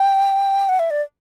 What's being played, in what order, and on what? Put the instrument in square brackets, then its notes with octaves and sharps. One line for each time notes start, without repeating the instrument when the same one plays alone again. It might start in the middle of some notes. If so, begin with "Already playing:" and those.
Already playing: [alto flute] G5
F#5
E5
D5